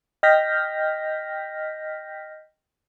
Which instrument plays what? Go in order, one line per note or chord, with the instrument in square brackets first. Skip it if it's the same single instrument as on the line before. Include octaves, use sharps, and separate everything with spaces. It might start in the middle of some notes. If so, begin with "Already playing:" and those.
[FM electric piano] D#5 G5 F6 G6 A#6 B6